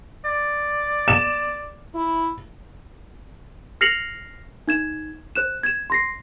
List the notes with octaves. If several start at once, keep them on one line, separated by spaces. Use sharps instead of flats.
D5
E7
E4
F6 A#6 C7 C#7 F7 F#7
D#4 G#6 E7
C5 F#6 E7
G#6 E7
C6 A#6 C7